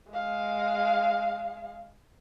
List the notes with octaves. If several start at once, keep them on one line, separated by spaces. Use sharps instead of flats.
G#3 F5